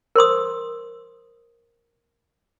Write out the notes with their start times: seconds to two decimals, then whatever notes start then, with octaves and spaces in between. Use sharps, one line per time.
0.16 A#4 C5 C6 D#6